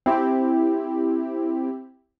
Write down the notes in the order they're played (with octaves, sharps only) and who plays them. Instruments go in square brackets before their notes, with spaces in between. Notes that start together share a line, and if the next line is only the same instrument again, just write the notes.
[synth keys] C4 E4 G4